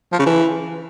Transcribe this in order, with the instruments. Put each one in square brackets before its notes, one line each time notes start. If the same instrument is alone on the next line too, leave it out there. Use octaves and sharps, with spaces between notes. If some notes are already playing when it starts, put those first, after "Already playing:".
[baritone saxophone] F3
C#3
E3